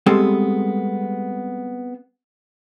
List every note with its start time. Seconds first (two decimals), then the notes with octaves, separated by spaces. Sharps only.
0.06 G3 G#3 B3 C4 A4